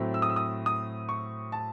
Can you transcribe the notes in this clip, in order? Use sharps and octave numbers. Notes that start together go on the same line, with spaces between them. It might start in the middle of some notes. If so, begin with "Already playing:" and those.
Already playing: A2 F#3 A3 C4
E6
D#6
E6
D#6
D#6
C#6
A5